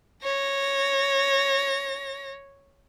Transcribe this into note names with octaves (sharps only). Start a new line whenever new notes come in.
C#5 A#6